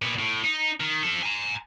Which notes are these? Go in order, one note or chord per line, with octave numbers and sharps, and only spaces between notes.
A#2 B3
A2
D#4
D#3
F3 A4
G#5 A#5